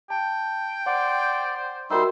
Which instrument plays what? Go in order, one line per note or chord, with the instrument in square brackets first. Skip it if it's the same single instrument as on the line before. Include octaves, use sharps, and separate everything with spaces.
[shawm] G5 [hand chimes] A5
[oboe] C5 [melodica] D5 [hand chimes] F#5
[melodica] G3 D#4 C5 [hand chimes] F#4 A#4 C6 [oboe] E5